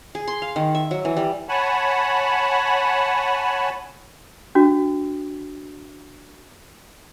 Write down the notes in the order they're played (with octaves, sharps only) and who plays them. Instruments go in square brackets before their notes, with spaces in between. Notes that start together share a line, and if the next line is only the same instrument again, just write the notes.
[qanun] G#4
C6
F5
D#3
E5
F#3
E3
G3
[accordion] C#5 F#5 G#5 A5 B5
[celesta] D4 F#4